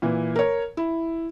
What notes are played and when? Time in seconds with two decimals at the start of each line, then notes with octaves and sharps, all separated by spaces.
0.02 A#2 E3
0.36 A#4 C#5
0.77 E4